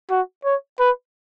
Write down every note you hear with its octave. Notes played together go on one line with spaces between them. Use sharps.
F#4
C#5
B4